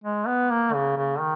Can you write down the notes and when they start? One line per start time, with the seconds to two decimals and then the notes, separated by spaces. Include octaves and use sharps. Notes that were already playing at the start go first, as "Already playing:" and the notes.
0.04 G#3
0.27 B3
0.50 A#3
0.73 C#3
0.97 C#3
1.20 D#3